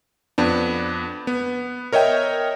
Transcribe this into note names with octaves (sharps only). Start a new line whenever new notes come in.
F2 B3 D4
B3
A#4 C#5 D#5 E5 G5